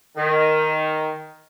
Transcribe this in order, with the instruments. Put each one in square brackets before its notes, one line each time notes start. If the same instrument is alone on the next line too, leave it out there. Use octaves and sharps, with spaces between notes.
[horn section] D#3